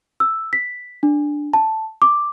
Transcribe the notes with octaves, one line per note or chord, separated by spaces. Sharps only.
E6
B6
D4
A5
D6